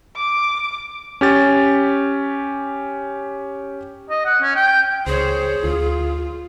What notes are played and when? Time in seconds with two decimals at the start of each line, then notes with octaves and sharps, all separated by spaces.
0.17 D6
1.21 C#4 G4 A6
4.10 D#5
4.25 F#5
4.42 C#4
4.56 G5
5.07 C#2 G#4 C5 C#5
5.64 D2 F4